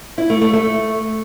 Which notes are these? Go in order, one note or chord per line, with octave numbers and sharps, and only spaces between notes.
E4
A3
A3
A3